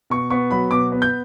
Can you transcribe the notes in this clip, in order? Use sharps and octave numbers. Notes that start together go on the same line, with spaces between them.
B2 C#6
B3 C#6
F#3 B5
B2 D6
B3
G6